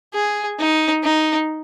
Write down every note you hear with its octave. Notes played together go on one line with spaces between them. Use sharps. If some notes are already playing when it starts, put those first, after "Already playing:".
G#4
D#4
D#4